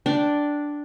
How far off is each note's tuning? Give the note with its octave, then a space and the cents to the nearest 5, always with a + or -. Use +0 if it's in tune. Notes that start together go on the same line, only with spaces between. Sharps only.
D4 +0 G5 -10